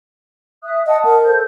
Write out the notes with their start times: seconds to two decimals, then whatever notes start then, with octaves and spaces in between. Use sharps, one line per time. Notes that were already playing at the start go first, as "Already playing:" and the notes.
0.63 E5 D#6 F#6
0.87 D#5 F#5 A5 D#6
1.05 A#4
1.25 A4 C5 G6